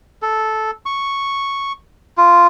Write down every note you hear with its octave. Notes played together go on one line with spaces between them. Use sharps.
A4
C#6
F4